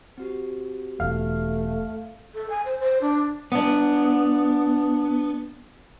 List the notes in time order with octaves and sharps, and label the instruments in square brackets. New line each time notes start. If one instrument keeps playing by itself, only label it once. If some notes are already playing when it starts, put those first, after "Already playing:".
[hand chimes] C4 F#4 G4
[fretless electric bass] E1 E2 [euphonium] A3 [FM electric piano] F5
[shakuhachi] A4
G#5
C5
C5
D4
[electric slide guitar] B3 D4